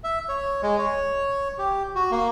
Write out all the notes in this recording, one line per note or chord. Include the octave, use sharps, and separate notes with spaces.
E5
C#5
G#3
C#5
G4
F#4
A#3